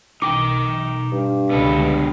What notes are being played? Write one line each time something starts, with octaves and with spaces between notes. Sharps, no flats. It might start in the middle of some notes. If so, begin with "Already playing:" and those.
B1 D#4 G5 D6
G2
C#2 B2 D3 B3 A4